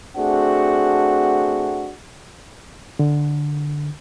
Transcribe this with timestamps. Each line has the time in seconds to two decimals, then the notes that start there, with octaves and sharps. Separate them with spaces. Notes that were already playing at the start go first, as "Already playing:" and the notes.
0.17 A3 C4 D4 F#4 G#4 F#5
2.99 D3